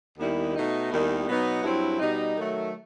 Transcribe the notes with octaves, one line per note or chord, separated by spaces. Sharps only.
D#2 D#3 G3 B3 E4
B2 A3 D#4
D#2 D#3 G3 B3 E4
B2 F#3 B3 D#4
G2 F#3 C4 E4
B2 G3 D#4
D#3 F#3 A3